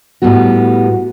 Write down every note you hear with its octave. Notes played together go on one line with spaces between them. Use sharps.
A2 G3 B3 F#4